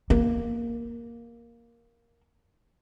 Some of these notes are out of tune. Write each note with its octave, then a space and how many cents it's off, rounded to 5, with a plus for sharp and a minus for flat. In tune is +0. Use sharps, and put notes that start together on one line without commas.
A#3 +5